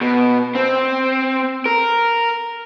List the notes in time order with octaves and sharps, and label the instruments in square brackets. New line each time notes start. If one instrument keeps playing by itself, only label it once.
[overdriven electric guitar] B2
C4
A#4